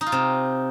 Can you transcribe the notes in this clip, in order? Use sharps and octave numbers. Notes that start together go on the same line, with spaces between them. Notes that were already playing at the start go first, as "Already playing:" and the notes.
D#4
F4
C3